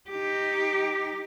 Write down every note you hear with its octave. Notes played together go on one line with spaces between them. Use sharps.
D#4 G4